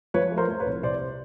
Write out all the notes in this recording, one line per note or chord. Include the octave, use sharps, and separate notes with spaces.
F3 B4 C#5
A3
A#4 C5
F3
B4 C#5
C2
C3 C5 D5